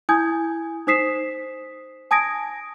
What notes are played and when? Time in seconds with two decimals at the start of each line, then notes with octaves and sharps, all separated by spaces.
0.09 E4 G#5 D#6 G6 G#6
0.87 D#4 C5 D#6 B6 C7 E7
2.11 G#5 A5 D#6 G#6 A#6 D7